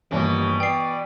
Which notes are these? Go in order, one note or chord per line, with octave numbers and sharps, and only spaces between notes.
G1 D#2 B2 E3 G3
B3 D5 G5 C7